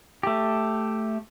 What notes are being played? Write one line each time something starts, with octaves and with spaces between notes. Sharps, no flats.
A3 G4